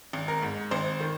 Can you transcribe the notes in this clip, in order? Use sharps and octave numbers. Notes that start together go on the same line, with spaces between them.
G#1
A#4
G#2
G#1 C5
D#3